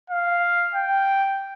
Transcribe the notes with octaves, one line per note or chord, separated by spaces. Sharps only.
F5
G5